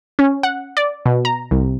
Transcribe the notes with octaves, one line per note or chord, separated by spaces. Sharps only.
C#4
F#5
D5
B2
A#5
C2